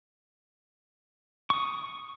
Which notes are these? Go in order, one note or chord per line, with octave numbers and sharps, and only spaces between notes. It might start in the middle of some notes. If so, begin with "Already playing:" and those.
C#6 D#6